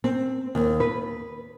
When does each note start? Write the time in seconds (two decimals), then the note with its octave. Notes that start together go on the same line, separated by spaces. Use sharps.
0.04 C4
0.55 D#2
0.80 B4